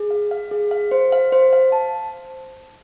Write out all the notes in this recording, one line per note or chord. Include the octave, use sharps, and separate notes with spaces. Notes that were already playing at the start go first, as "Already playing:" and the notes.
Already playing: G#4
F5
F5
G#4
F5
C5
F5
C5
F5
A5